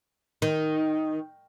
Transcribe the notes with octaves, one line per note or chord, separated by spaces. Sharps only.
D#3